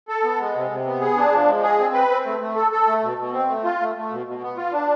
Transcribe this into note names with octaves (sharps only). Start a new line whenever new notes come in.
A4
B3
G#3
C3
C3
B3
G#4
D4
F3
G#3
G#4
C4
B4
C4
A3
A3
A4
A4
A3
B2
B2
C4
A3
F4
A3
A3
B2
B2
B3
F4
D4